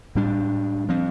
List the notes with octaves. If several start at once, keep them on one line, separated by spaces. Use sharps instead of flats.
A2 G3 D4
F3 C4